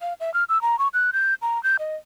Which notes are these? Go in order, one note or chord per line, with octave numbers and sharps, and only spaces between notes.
F5
E5
F6
E6
A#5
C#6
F#6
G6
A#5
G6
D#5